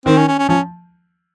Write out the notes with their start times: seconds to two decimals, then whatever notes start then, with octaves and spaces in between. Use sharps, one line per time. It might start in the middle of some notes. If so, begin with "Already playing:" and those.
0.06 D#3 C4
0.17 C#4
0.28 C#4
0.39 C#4
0.49 F3 C#4